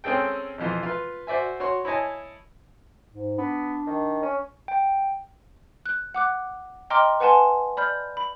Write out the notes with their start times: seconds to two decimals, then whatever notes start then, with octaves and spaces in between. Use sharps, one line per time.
0.04 C4 C#4 G#4 A4 G5
0.58 F2 B2 E3 F3
0.83 F4 B4
1.27 F#4 C5 D5 E5 G#5
1.60 F#4 C#5 C6 C#6
1.85 E4 C#5 D#5 G#5 A5
3.12 G#2
3.38 B3 D4
3.87 D#3
4.22 C#4
4.68 G5
5.86 F#6
6.14 F#5 D6 F#6
6.90 D#5 G5 A#5 C6 D6 F6
7.20 B4 F#5 G#5 A5 C6
7.77 D5 B5 F6 G6
8.17 B5